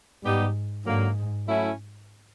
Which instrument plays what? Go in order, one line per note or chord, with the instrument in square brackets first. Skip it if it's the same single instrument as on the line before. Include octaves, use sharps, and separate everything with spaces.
[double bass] G#2 [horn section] G3 B3 D#4 G4
[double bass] G#2 [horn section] D3 F#3 A#3
[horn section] F#3 A3 C#4 E4